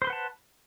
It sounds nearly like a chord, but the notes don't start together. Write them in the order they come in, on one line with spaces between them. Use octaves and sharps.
C5 C6 B4 F#5 A5